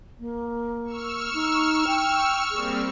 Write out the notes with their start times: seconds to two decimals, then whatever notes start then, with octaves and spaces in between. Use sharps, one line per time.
0.19 A#3
0.84 C#6 E6 F6
1.33 D#4
1.86 G5
2.51 G3 A#3 C4 G#4